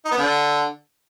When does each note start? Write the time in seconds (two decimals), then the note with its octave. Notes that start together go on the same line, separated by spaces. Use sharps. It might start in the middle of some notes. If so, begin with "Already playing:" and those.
0.05 D#4
0.11 B3
0.18 D3